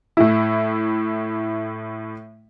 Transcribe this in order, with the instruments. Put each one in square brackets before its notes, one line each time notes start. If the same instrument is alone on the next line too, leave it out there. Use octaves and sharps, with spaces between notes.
[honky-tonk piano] A2 E4